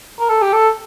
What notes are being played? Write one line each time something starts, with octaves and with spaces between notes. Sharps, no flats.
A#4
A4
G4
A4